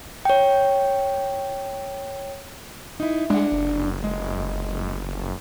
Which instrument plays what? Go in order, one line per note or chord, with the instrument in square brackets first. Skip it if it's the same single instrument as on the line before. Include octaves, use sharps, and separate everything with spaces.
[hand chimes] C#5 G5
[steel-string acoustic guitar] D#4 E4
[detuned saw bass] G#3 [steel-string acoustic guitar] D4 F#5
[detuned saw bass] F#1
[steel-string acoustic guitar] G#3